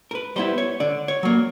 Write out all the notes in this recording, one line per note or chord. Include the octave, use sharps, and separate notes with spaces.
A#4
B4
G3 B3 E4 C5
C#5
D3 D5
C#5
F#3 A#3